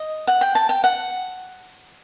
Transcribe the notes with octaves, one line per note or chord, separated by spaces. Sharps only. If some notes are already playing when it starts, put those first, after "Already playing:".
Already playing: D#5
F#5
G5
A5
G5
F#5